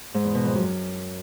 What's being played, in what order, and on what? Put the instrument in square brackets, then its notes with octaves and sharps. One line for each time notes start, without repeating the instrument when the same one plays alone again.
[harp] G#2
E2
B2
F2
F#2